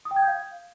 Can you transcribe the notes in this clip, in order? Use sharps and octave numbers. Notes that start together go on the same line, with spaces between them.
D#6
G5
G#6
G6
F5